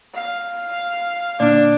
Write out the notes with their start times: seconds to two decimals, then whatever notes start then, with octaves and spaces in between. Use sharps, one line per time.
0.15 F5
1.40 A#2 D3 D4 D5